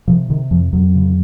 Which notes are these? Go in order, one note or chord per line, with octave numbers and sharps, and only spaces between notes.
C3 F3
C3 D#3
F2 F3
F2 F#3
C#3